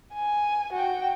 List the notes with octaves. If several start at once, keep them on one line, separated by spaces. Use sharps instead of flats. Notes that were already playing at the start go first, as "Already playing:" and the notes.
G#5
F#4 G5